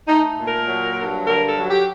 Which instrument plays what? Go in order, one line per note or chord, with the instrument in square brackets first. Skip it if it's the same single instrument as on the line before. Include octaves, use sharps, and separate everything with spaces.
[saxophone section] A3 D#4
A#2
A#4
F#3
G2
D3 A#4
A4
F#3
G4